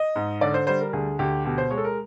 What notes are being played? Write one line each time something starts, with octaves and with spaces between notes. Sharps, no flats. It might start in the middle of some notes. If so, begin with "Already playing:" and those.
Already playing: D#5
G#2
D3 D5
C5
G3 C5
A#4
D2 G#4
D2 G4
B2 G4
C5
G#3 C#5
A4
A#4